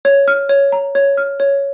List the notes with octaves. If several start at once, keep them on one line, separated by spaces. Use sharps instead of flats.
C#5
F6
C#5
A#5
C#5
F6
C#5